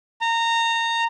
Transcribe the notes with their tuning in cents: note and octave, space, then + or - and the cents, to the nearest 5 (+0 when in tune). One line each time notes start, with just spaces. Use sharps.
A#5 -20